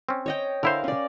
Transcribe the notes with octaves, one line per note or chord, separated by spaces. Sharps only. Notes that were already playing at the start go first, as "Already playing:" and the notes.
C4 C#4
C#5 D#5 G5
D3 E4 A#4 C5 F5
C#4 D5